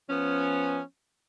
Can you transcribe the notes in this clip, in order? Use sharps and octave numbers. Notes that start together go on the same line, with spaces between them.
F3 B3 C#4